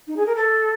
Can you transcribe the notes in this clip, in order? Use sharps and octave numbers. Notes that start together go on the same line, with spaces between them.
D#4
G#4
A#4
A4